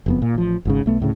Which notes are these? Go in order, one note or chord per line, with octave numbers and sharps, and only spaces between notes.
F#1 F2 B3
A#2
A1 F3
G#1 G#2 C#3
B1 A3 B3
D2 A2 C#3